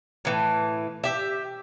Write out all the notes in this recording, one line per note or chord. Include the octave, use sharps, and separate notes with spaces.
A2 E3
G4 E5